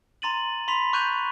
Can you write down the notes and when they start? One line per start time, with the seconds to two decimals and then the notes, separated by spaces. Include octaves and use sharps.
0.22 A#5 C6 A6 D#7 F#7
0.68 B5 C6 B6 F7
0.93 C#6 F#6 G6 D#7 F7